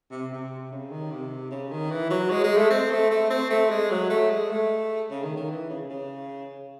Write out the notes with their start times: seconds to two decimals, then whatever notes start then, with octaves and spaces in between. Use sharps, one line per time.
0.11 C3
0.32 C3
0.72 C#3
0.91 D#3
1.11 C3
1.51 C#3
1.71 D#3
1.91 E3
2.11 F#3
2.30 G#3
2.44 G#3
2.57 A3
2.70 C4
2.91 A3
3.11 A3
3.30 C4
3.50 A3
3.70 G#3
3.91 F#3
4.10 A3
4.31 G#3
4.50 A3
5.10 C#3
5.23 D#3
5.37 D#3
5.50 E3
5.70 C#3
5.90 C#3